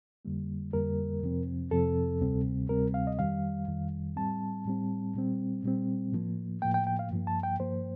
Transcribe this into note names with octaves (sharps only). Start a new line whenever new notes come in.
F2 D3 G3 A#3
F2 D3 G3 A#3 A#4
F2 C3 F3 C4
F2 C3 F3 C4 A4
D2 C3 G3 C4
D2 C3 G3 C4 A#4
F5
D#5
F2 D#3 G3 F5
F2 D#3 G3
A2 G3 C4 A5
A2 G3 C4
A#2 G3 C4
A#2 G3 C4
A2 F3 A#3
A2 F3 A#3 G5
G5
G5
F5
G2 F3 A#3
A5
G5
G2 F3 A#3 C5